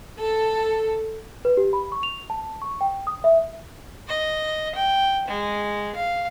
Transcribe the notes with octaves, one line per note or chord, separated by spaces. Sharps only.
A4
B4
G4
B5
C#6
F7
A5
C#6
G5
D#6
E5
D#5
G5
G#3
F5